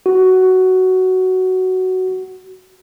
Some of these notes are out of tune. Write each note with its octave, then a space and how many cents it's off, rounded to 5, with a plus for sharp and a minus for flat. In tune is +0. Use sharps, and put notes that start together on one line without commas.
F#4 +10